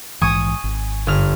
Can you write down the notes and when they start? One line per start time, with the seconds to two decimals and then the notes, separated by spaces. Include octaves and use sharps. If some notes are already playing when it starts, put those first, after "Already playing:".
0.21 A#1 G#2 E3 G#5 C#6 D#6
0.64 G#1
1.07 G1 F6